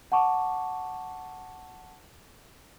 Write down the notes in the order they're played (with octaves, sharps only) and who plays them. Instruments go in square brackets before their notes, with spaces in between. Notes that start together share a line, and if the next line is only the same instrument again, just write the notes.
[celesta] F#5 A5 C#6 D6